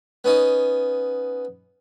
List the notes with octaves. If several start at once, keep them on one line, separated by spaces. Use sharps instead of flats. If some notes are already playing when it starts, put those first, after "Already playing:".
B3 C#4 D#4